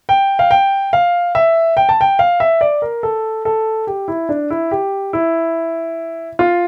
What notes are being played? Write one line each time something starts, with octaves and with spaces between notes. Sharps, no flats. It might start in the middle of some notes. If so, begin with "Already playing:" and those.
G5
F5
G5
F5
E5
G5
A5
G5
F5
E5
D5
A#4
A4
A4
G4
E4
D4
E4
G4
E4
F4